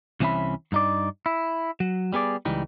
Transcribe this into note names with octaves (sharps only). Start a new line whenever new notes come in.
C2 E3 C4 C#4 E5 B5
G2 D#4 D5
E4
F#3
G3 B3 G#4 D5
C#2 E3 G3 D#4